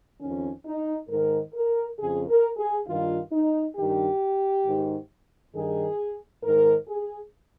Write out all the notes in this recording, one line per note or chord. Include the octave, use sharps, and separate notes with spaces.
F2 D#3 C#4
D#4
G#2 D#3 A#4
A#4
F2 C#3 G#4
A#4
G#4
G2 D#3 F4
D#4
G2 D#3 G4
G#2 D#3
G2 D#3 G#4
G#2 D#3 A#4
G#4